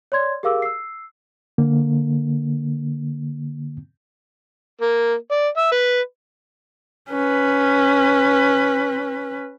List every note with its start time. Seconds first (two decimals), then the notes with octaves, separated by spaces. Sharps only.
0.12 C#5 D5 C6 G#6
0.43 G4 G#4 A#4 F5 D6 E6
0.62 E6 C7
1.58 D3 A#3
4.81 A#3
5.31 D5
5.57 E5
5.72 B4
7.10 C#4 B4